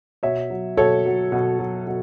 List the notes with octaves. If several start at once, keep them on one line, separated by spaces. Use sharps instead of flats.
B2 C#5 E5
F#3
B2 A4 C#5
F#3
B2
F#3
B2